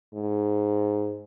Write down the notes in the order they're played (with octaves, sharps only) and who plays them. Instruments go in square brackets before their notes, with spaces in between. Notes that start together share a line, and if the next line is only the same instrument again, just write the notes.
[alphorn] G#2